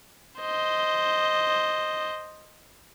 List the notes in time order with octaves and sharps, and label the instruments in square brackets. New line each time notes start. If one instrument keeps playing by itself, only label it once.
[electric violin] C5 D#5